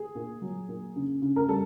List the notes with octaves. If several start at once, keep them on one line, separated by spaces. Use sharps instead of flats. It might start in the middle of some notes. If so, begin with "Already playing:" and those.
Already playing: G#4
A#2
F#3
A#2
C#3
C#3
A#4
G3 A4